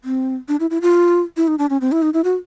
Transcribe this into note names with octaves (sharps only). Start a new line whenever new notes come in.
C4
D4
E4
E4
F4
E4
D#4
D4
C#4
C4
E4
D#4
E4
F#4